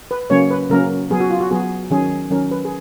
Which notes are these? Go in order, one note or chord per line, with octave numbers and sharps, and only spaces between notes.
B4
C#3 F#3 A#3 C#4 C#5
B4
C#3 F#3 A#3 C#4 A#4
F#3 B3 G#4
F#4
F4
F#4
F#3 B3 G#4
D#3 F#3 C#4 G#4
D#3 F#3 C#4 A#4
B4
G#4